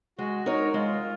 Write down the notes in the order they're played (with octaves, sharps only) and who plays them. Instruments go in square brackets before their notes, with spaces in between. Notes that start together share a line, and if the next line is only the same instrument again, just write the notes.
[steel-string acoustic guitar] G#3 [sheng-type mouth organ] F#4
[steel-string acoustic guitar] D#4 A#4 C#5
[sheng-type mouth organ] F#4
[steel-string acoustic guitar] G#3 [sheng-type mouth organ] F4